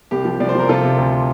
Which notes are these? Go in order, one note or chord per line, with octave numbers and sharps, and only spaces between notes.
C2 G4
F3
C2 D5
C5
F3 A#4
C3 F4 A4
C3
D2